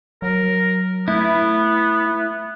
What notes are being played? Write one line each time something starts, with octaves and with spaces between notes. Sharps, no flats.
F#3 A#4
A3 B3 E4